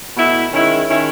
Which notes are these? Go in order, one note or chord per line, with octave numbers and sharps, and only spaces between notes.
B2 A3 E4
D#3 G#3 C#4 E4
D#3 G#3 C#4 E4